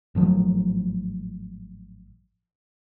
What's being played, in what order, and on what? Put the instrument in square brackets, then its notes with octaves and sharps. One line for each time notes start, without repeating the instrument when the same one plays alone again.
[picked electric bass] G#1 A2 F3 F#3